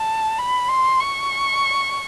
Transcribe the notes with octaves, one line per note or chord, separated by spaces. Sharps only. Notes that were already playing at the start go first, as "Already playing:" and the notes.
Already playing: A5
B5
C6
C#6